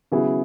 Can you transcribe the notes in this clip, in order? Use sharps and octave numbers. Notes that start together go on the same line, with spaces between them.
C#3 F#3 B3 E4 G#4